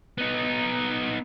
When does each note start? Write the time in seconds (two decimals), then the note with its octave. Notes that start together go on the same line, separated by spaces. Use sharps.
0.18 B3 D#4